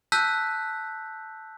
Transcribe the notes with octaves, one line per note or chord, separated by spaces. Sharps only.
A5 E6 F#6 G6 B6